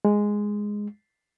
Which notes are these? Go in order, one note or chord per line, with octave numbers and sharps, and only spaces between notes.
G#3